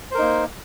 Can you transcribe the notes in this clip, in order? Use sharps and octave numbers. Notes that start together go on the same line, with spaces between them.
A#3 D#4 A#4 C5